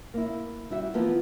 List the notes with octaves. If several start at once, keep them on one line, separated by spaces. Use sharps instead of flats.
A#3 E4
G3 E4 F#4 E5
E3 F3 A#3 B3 E4